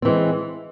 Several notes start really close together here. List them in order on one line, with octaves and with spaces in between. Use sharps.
C4 E3 G#3